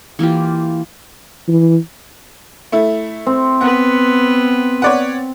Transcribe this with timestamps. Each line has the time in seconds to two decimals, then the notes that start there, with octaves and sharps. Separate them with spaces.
0.19 E3 A#3 F4 G4
1.48 E3
2.72 A3 E4
3.27 C4
3.61 B3 B4 F#5
4.82 C#5 D5 F#5